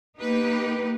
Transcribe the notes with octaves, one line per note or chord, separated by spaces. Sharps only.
A#3 B3 D#4 G4 B4